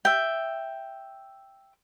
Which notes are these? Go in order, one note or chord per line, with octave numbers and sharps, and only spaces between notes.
E5 G5